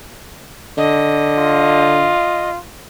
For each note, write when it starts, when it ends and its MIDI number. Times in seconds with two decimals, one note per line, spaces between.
0.77 2.12 50
0.77 2.50 75
1.39 2.59 65